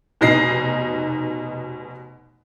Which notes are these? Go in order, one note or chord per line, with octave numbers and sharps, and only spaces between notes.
F1 B2 D#4 A#6 C7